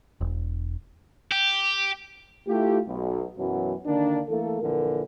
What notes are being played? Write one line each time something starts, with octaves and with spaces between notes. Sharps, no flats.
E1
G4
A3 E4 F4 G4
B1
F#2 B2 E3 F#3
D3 D#3 A#3 D4
E3 A3 A#3 A4
A#1 D3 E3 A#4